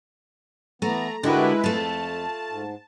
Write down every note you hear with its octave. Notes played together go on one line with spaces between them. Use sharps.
E3 A3 B3 A#5
D3 G#3 D4 E4 F#4 G4 A#4 B4
F2 A3 F4 A5
G#2